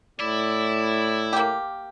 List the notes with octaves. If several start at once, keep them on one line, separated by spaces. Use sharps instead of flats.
A2 E4 D5
A#3 G4